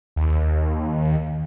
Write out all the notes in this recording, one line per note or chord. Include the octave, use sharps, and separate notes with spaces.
D#2